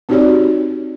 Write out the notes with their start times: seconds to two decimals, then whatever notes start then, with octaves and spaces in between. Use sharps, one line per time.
0.09 C4 D#4 F#4 G4 C#5 D5